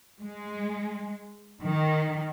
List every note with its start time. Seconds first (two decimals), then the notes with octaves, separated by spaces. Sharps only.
0.23 G#3
1.61 D#3